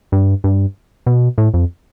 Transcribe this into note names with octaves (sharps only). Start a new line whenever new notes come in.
G2
G2
B2
A2
F2